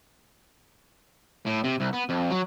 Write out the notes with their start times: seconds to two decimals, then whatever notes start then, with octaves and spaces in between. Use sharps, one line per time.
1.47 A2
1.64 C3
1.80 C2
1.93 B3
2.09 F2
2.31 F#3